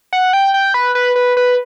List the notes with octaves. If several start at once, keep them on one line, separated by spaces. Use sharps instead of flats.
F#5
G5
G5
B4
B4
B4
B4